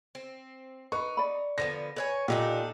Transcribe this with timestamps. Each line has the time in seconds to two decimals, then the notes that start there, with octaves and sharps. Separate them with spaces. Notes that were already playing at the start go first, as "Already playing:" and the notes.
0.15 C4
0.92 D#4 B4 C#6
1.17 D5 B5
1.58 D3 F3 B3 A#6
1.96 D4 B4 C#5 G#5
2.28 A#2 D4 D#4 G4 A4